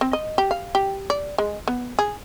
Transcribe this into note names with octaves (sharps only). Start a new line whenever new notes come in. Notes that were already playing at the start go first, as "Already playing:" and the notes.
C4
D#5
G4
F5
G4
D5
G#3
B3
G#4